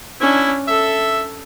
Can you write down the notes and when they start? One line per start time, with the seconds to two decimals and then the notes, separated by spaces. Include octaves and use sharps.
0.21 C#4 D4 E4
0.68 A4 E5